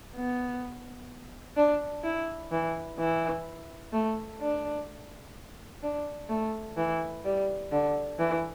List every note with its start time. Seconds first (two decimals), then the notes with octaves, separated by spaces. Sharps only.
0.15 B3
1.56 D4
2.04 E4
2.51 E3
2.99 E3
3.93 A3
4.41 D4
5.83 D4
6.29 A3
6.77 E3
7.25 G3
7.72 D3
8.19 E3